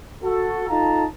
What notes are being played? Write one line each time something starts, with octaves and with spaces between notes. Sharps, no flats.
F#4 A4
D#4 F4 A4 F5 A5 A#5